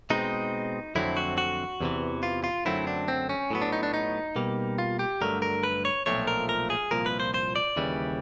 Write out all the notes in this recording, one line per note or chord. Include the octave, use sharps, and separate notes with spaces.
B2 G#3 C4 D#4
F2 D3 F#3 A3 C4 E4
F#4
F#4
E2 C3 E3
F4
F4
F#2 D3 F#3 A3 C4 E4
D4
C4
C#4
A2 F#3 B3
D4
D#4
D4
D#4
B2 G3 A#3
F4
G4
G2 D3 F#3 A3 A#4
A#4
B4
C#5
B1 A#2 F3 A3 C4 C#5
A#4
A#4
G#4
C2 A#2 F3 A#3 A#4
B4
C5
C5
D5
D#2 C#3 E3 G3